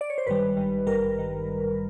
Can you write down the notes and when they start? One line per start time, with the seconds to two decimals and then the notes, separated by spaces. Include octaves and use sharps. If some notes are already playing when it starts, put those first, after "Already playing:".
0.01 D5
0.10 C#5
0.18 C5
0.26 G#1 G2 D#3 G3 B4
0.56 G#1 G2 D#3 G3
0.87 G#1 G2 D#3 G3 A#4
1.19 D#3 G3